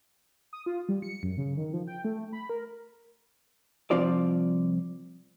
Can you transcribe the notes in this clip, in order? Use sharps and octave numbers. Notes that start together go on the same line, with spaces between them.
D#6
F4
G3
C#7
F#2
C#3
D#3
F3
G5
A3
B5
A#4
C2 F3 C4 F4 D5